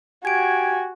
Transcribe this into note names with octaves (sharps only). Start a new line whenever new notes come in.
F#4 G4 G#5 G#6 D7